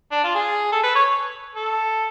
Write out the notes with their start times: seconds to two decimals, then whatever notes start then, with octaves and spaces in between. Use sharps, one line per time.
0.12 D4
0.24 F4
0.35 G#4
0.72 A4
0.83 B4
0.96 C#5
1.55 A4